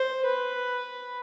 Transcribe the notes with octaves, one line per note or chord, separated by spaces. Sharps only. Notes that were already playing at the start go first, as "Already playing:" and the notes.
Already playing: C5
B4